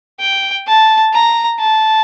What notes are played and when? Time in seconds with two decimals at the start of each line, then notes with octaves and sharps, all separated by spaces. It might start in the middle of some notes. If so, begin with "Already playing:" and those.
0.20 G5
0.67 A5
1.13 A#5
1.59 A5